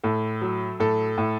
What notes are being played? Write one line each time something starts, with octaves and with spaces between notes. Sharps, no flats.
A2 A4
F#3
A2 A4
A2